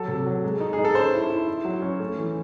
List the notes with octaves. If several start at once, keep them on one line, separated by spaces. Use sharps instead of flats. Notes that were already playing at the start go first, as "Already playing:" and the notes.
Already playing: F#3 A4
C3
F#3
G#3
D#4
G#4
D#4
A4
C#4 C5
E4
E4
E4
F#3
C#4
A3
E3